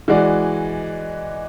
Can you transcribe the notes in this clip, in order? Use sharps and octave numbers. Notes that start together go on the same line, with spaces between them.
E3 G#3 F#4 D5